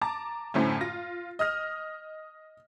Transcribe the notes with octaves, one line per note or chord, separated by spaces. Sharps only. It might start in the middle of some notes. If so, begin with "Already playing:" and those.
A5 A#5 D6 A6
F#2 A2 D3 A3 C4 C#4
F4 A#6
D#5 D#6 F6 A#6